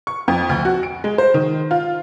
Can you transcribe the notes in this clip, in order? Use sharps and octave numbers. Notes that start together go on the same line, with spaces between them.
C#6
F2
D2
F#4
D7
G#3
C5
D#3
F4